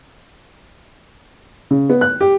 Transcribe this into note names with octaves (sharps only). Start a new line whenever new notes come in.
C#3
B3
F#6
G4